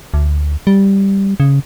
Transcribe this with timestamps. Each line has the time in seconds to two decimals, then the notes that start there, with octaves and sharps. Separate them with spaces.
0.14 D2
0.67 G3
1.40 C#3